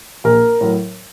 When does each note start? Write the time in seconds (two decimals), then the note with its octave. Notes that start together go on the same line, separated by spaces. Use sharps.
0.24 A#1 A#4
0.61 A2 F#3